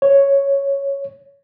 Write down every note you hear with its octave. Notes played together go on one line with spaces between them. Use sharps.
C#5